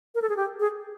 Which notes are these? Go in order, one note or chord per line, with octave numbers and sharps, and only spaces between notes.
A#4
A4
G#4
G4
G#4